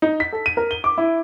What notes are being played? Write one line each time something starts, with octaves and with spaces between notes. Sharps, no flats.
D#4
B6
A4
D#7
A#4
G7
D6
E4